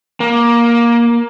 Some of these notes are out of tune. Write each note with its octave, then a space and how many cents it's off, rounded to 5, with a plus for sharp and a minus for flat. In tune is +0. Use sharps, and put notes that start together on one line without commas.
A#3 +15